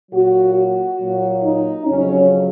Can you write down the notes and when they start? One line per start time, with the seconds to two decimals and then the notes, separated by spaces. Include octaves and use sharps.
0.12 A#2 F#3 F#4
0.56 F#4
1.00 A#2 F#3
1.43 D#4
1.86 F2 C#3 F#3 C#4